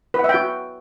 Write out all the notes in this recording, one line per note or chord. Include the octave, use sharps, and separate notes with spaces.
B4
F#5
E5
G5
F#4